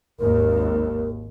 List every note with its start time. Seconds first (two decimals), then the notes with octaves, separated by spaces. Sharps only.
0.19 G#1 D#2 A#4